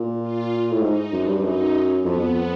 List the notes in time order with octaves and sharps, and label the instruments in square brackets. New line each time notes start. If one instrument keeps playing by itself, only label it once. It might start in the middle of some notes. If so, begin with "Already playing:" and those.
Already playing: [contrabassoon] A#2
[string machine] F4
[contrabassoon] A2
[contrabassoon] G#2 [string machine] D#4
[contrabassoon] F#2 [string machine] D4
[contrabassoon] G2
G2
[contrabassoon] F#2 [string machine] D#4
[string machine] C#4
[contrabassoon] F2 [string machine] B3
[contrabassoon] F2